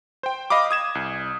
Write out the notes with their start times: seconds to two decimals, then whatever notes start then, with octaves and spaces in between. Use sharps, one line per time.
0.23 C5 G5
0.50 D#5 F5 B5 D6
0.71 D#6 G#6 E7
0.95 C2